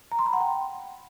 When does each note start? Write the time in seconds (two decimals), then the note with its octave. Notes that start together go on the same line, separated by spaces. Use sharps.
0.12 A#5
0.19 C6
0.26 B5
0.33 F#5
0.41 G5